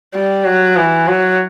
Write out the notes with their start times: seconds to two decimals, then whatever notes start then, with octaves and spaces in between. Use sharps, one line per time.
0.14 G3
0.45 F#3
0.76 E3
1.07 F#3